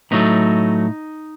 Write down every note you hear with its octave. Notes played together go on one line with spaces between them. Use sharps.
A2 F#3 A3 B3 D#4